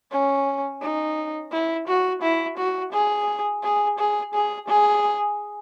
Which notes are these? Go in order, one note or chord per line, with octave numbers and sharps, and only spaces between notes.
C#4
D#4
E4
F#4
E4
F#4
G#4
G#4
G#4
G#4
G#4